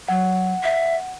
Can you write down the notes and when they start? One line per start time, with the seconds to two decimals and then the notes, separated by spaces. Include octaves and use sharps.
0.08 F#3 F#5
0.63 E5